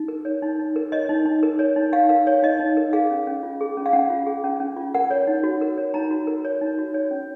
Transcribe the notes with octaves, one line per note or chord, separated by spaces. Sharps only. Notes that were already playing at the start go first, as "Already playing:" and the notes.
Already playing: D#4
A#4
C#5
D#4
D#4
A#4
C#5 D#5
D#4
D#4
A#4
C#5
D#4
D#4 F5
A#4 F5
C#5
D#4 D#5
D#4
A#4
G#4 F5
C#4
C#4
F4
G#4
C#4
F5
C#4 F#5
F4
G#4
C#4
C#4
F4
A#4 F#5
C#5
D#4
F#4
A#4
C#5
D#4 A#5
F#4
A#4
C#5
D#4
F#4
C#5
C#4